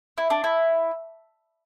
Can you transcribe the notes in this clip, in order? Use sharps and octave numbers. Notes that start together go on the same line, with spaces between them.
E4
D4
E4